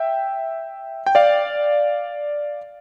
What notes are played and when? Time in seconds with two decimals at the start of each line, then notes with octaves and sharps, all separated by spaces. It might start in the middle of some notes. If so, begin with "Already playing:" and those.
Already playing: E5 G5
1.06 G5
1.15 D5 F5